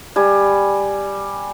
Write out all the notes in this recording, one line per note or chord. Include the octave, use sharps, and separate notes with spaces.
G3 G#5